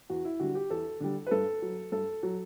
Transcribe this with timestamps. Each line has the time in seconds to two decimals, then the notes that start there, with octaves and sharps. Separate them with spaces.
0.10 E2 F#4
0.25 E4
0.40 D3 G3 F#4
0.55 G4
0.70 E2 A4
1.00 D3 G3
1.26 B4
1.31 G2 A4
1.62 F#3
1.92 G2 A4
2.23 F#3